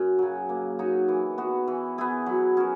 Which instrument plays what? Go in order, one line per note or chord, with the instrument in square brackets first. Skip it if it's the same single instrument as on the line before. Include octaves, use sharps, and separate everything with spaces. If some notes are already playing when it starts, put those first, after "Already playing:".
Already playing: [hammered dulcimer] F#2
C#3 F#3
A#3
D#4 F#4 C#5
E3
B3 F#4
E3
B3 E4 G#4
F#3
C#4 F#4 A#4